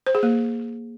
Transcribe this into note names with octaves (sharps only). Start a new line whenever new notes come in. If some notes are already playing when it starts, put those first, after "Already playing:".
C5
G#4
A#3